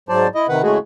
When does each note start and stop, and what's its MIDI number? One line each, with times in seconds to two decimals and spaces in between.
0.09 0.27 44
0.09 0.27 54
0.09 0.27 72
0.09 0.27 74
0.09 0.27 81
0.35 0.46 64
0.35 0.46 75
0.49 0.62 48
0.49 0.62 51
0.49 0.62 71
0.49 0.62 78
0.63 0.78 45
0.63 0.78 49
0.63 0.78 56
0.63 0.78 57
0.63 0.78 66
0.63 0.78 68